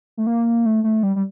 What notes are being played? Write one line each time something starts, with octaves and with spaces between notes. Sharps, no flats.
A3
A#3
A3
A3
G3
G3